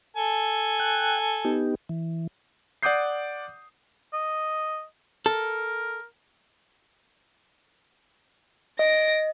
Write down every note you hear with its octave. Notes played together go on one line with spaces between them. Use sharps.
A4 G#5
G5 F#6
B3 D#4 G4
E3
D5 F#5 D6 D#6 G6 C7
D#5
A4 A#4
D#5 A#6 D7